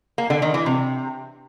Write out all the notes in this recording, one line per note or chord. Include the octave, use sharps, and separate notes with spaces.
A#3
D3
D#3
E3
C3